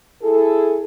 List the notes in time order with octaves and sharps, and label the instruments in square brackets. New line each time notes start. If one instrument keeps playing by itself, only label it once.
[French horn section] E4 G#4 A4